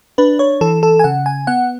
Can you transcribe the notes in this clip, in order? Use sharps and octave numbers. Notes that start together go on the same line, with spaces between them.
D4 B4
C#5
E3 A4
A4
G#5
C#3 F#5
G#5
B3 F#5